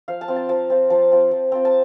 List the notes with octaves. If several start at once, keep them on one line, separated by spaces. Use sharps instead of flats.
F3 F5
A5
C4 F4
A5
F3 A5
C4 F4
F3 A5
C4 F4
F3
C4 F4
A5